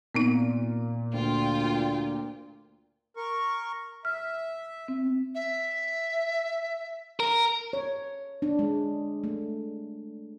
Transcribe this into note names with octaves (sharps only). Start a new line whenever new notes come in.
A#2 B3 C4 D#4
D2 F4 G5
A#4 C#6
E5 F6
C4
E5
A#4
C#5
D4
G#3
A3